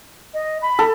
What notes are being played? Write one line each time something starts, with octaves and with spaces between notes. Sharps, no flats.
D#5
B5
A4